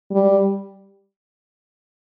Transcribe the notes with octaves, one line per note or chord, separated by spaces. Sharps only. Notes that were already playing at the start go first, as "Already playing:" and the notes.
G3